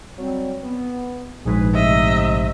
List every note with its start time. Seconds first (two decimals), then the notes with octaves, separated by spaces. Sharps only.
0.17 F#3 G3 C4
0.63 B3
1.45 A#1 G#2 G#4 B4
1.74 C3 A3 D#5 E5